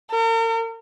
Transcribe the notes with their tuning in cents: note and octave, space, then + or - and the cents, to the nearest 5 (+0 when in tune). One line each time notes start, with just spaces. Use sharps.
A#4 -40